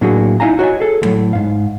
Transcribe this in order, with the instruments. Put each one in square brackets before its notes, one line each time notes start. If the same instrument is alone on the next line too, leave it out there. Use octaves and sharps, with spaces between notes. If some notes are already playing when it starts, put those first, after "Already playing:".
[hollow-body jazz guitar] A2 F#3 A#3 D4 F#4 G#4
D#4 E4 F5 G#5 A#5
F#4 C#5 D#5 G#5
G#4 A4
D2 A2 F#3
G#2 F5